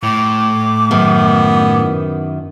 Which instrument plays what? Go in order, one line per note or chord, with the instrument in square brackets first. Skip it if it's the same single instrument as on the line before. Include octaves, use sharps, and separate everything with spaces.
[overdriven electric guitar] A2 [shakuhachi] D6
[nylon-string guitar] F#2 D#3 [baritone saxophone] B3